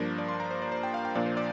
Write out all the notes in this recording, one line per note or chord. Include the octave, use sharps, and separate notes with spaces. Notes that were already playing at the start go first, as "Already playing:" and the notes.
Already playing: G2 F3 A#3 D4 A#4
D5
C6
A#5
C5
D5
C5
G5
F5
G5
A#2 F3 A#3 D4 D5
C5
D5